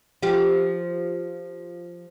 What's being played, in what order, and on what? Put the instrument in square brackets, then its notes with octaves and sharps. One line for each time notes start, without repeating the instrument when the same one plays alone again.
[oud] F3 G4